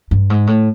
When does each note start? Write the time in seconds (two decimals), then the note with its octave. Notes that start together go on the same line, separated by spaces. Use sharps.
0.11 G2
0.30 G#2
0.47 A2